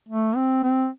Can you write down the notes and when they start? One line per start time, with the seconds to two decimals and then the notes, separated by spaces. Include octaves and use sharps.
0.09 A3
0.36 C4
0.63 C4